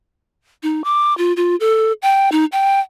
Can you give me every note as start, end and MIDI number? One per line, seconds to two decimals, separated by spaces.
0.63 0.84 63
0.84 1.16 86
1.18 1.33 65
1.37 1.56 65
1.60 1.92 69
2.02 2.29 79
2.32 2.45 63
2.52 2.80 79